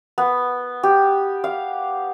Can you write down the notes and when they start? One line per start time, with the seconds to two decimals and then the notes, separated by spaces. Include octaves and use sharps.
0.18 B3
0.83 G4
1.44 F5